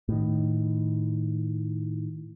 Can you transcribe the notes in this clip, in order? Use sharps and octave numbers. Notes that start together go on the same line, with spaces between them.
A2 D#3